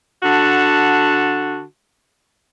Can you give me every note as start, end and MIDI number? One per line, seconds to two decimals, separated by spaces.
0.23 1.63 50
0.23 1.63 66
0.23 1.63 81